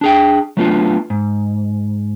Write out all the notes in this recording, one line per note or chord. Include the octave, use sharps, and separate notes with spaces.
D4 G#4 G5
F#3 A3 B3 D4 F4
G#2